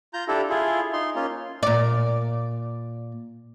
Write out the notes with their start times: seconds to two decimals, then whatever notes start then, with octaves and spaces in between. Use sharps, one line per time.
0.14 F4 A#5 G6
0.28 D4 E4 G4 A4
0.50 E4 F4 G#4
0.93 D#4 C6
1.15 A#3 C#4 F4
1.63 A#2 D5